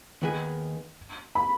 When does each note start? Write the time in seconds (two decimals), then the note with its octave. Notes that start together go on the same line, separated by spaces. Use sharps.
0.22 D#2 D#3 B3 G#4
1.35 B5